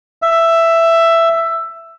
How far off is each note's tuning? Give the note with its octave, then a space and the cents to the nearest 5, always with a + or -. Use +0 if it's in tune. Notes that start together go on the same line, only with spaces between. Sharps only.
E5 +10